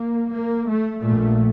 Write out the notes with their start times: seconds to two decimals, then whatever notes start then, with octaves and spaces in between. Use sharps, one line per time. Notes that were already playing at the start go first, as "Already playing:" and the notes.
Already playing: A#3
0.33 A#3
0.68 A3
1.03 A#1 A#2 A3